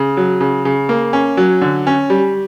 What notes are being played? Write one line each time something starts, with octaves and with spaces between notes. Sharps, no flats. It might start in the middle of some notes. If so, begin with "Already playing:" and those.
Already playing: C#3
F#3
C#3
C#3
A#3
C#4
F#3
D3
C#4
G3